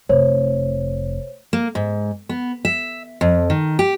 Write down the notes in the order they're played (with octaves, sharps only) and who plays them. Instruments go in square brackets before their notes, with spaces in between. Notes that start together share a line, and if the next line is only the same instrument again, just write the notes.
[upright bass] F1 [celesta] C5 C#5
[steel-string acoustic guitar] A#3
G#2
B3
E5
F2
D#3
G4